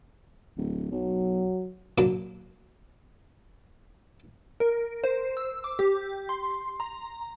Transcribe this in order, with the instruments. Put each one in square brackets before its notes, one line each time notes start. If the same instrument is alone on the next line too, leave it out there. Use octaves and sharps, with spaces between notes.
[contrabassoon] D1
[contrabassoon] B1 [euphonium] F#3
[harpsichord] A#2 F#3 A#3 D4
[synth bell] A#4
C5
E6
D6
G4
C6
A#5